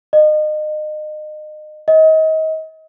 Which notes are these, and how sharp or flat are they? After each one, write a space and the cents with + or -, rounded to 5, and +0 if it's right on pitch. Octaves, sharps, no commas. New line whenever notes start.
D#5 -30
D#5 +30